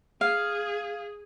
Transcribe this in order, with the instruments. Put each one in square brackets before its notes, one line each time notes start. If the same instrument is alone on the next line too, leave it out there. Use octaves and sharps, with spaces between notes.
[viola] G#4 [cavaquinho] F5